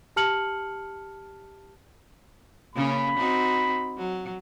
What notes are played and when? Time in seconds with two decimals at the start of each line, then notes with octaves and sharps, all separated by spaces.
0.16 G4 A5 F6 C#7 F#7
2.76 C#3 A#3 C#4 B5
3.18 C4 D#4 F#4
3.98 F#3